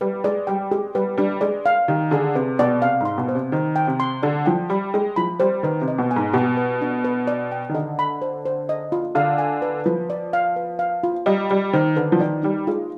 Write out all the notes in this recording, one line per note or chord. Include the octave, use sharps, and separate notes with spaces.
G3 B4
G#3 D5
G3 G5
G#3 G4
G3 B4
G3 D4
G#3 D5
F5
D#3 G4
D3 G#4
C3 B4
B2 D5
C3 F5
G#2
C6
B2
C5
C3
D#3 C5
G5
C3
C6
D3 D5
F3 G5
G3 B5
G#3 G5
F3 B5
G3 C5
D#3 B4
C3
D#5
B2
G#5
G#2
B2 G4
B4
D4
B4
D5
G5
D#3
D3 D#5
B5
C5
C5
D#5
F4
D3 F5
G#5
B4
F3 B4
D5
F5
B4
F5
F4
G3 D#5
G3 B5
D#3 C5
D3 B4
F3
D#3 D5
G3 D#4
G#3 F4